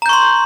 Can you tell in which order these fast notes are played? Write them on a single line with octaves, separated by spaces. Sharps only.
A#5 G6 C#6 C6